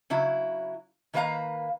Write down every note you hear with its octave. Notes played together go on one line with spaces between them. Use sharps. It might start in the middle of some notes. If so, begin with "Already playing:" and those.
C#3 F#3 E4
D#3 A#3 B4 C#5 F5 A#5